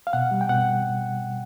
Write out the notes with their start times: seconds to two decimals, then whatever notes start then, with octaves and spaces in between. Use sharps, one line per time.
0.07 F5
0.13 B2 F#5
0.31 G3
0.41 G5
0.49 B2 F#5
0.67 G3